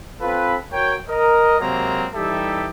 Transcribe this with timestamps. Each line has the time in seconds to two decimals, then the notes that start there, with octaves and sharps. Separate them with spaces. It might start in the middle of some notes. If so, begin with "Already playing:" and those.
0.21 C4 F4 A4 B4
0.73 F#4 A#4 C#5 G5
1.08 A#4 D#5
1.60 C3 F#3 G#3 A#3 C4 A#5
2.14 E3 G3 D#4 G4 A4 E5